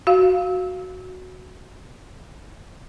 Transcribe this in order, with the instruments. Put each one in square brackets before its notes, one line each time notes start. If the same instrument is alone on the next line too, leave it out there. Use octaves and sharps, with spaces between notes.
[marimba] F#4 F5